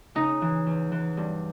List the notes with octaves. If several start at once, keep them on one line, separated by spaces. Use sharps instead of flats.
C#3 D#4
E3
E2
E3
G2